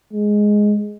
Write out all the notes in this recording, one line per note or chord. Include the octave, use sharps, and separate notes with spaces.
G#3